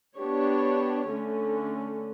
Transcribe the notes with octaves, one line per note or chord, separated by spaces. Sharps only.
B3 D4 G4 C#5
D3 A3 C#4